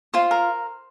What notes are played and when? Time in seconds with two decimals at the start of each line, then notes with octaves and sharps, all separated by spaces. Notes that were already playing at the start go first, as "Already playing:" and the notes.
0.14 F4 C5 C6
0.31 A#4